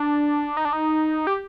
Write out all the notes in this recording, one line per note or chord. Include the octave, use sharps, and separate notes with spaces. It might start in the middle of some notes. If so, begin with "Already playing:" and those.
Already playing: D4
D#4
D4
D#4
G4